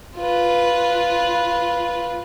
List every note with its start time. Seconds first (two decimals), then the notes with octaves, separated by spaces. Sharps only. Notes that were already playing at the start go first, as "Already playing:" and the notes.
0.17 F4 B4